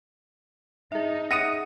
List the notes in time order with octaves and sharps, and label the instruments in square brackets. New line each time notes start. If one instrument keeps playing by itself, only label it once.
[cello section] D#4 [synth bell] G#4 E5
[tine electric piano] F#5 D#6 [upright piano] A#6 C#7 D#7